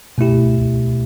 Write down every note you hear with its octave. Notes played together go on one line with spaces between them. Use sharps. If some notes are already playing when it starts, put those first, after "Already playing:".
B2 A3 E4 G4